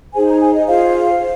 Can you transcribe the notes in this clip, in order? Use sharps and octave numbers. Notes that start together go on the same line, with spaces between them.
D#4 G#4 C5 G#5
A#5
G#5
D#5
F4 G#4 C5 F5
C5